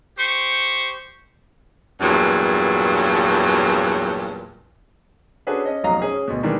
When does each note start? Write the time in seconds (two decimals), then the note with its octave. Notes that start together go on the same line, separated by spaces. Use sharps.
0.18 G4 C5 C#6
2.01 E2 G2 A#2 F#3
5.47 C#4 D4 F#4 G#4 A4 B4
5.65 C#4 D#5
5.83 F1 B1 F#3 D#5 F5 A#5
6.02 C#4 G#4
6.28 D2 B2
6.43 D#3 E3 G3 G#3 A#3 D4